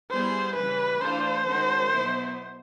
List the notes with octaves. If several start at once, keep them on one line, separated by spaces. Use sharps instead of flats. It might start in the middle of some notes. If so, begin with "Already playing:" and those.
G3 B3 E4 G#4 C5
C#3 E3 G3 B4
E3 A3 D4 F4 A4 C5
D#3 G#3 C#4 F#4 A4
B2 F#3 B3 E4